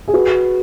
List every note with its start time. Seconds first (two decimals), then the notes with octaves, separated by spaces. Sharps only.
0.08 G#4
0.14 F#4 B4